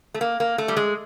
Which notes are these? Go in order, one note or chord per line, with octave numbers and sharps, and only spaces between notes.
A3
A#3
A#3
A3
G3
G#3